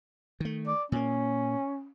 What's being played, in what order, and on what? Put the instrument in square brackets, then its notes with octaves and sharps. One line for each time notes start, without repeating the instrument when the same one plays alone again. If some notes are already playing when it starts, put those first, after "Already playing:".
[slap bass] D#3 A3
[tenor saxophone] D5
[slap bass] A#2 A#3 [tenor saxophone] C#4